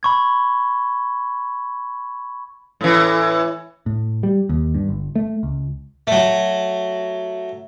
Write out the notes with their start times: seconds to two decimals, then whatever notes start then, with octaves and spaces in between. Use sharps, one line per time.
0.03 B5 C#6 G#6
2.81 A2 E3
3.86 A2
4.23 G3
4.49 D#2
4.74 G2
4.89 G1
5.16 A3
5.43 C#2
6.07 F#3 A3